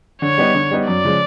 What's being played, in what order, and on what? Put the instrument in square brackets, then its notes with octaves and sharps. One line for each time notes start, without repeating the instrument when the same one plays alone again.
[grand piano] D3 [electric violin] C#5
[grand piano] G3 B3 D#4
D3
G3 B3 D#4
[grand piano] F#2 [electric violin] D5
[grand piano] C#3 F3 G#3